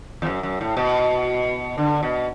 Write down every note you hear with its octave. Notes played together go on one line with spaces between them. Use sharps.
E2
F#2
F#2
A2
B2
D3
B2